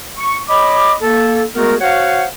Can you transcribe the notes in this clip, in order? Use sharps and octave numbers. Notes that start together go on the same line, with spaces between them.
C#6
C#5 D#5 B5 D6
A#3 A4
G#3 A3 B3 F#4 G#4 A#4
F#4 C5 C#5 F5 F#5